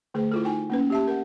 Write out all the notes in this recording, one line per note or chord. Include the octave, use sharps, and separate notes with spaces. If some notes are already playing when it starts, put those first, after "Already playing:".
D3 A3 G#4 B4
E4 F4 A4
D#4 G5 G#5
A#3 C#4 B4
G4 E5 A5
A#4 F#5